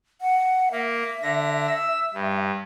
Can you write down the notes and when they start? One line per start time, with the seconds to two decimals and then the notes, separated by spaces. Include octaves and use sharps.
0.21 F#5
0.71 A#3 E5
1.22 D3 A#6
1.67 E6
2.14 G2